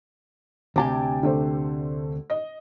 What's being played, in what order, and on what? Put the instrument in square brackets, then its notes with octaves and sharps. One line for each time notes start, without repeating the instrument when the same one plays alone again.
[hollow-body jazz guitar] D2 C3 G4 [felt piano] G#5 A5 D6
[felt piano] D3 A3 C5
D#5